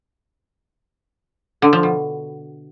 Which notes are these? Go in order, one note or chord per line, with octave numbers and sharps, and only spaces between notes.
D3
F3
B2